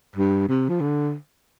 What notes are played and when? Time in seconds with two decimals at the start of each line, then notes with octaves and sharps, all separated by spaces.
0.16 G2
0.48 C3
0.69 F3
0.80 D3